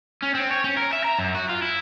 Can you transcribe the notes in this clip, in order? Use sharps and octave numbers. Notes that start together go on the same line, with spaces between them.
C#4
C4
C#5
C#4
A#4
E5
A#5
F#2
F#4
F4
E4